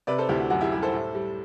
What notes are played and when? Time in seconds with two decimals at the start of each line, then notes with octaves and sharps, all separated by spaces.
0.07 C3 B4 D5
0.18 A4 C5
0.29 D2 E4 G4
0.40 F#4
0.50 F#2 F#4
0.61 E4 G4
0.71 G3 E4 G4
0.82 A4 C5
0.93 A2
1.15 G3